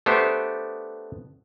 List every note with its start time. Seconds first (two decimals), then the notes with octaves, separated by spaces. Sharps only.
0.06 A3 B3 D4 G4 C5 G5